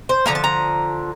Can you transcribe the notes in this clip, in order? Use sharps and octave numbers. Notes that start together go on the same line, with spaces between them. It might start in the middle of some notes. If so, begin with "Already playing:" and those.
C5
D3 F3 A#3 A#5
A5
A#5